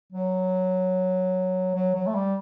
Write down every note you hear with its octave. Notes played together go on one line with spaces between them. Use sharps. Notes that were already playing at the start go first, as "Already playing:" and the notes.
F#3
F#3
F#3
A3
G3